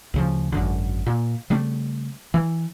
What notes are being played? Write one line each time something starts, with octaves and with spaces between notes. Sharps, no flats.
D2 C#3 F3
G#1 F#2 D3
A#2
C#3 G3 A3 C4
E3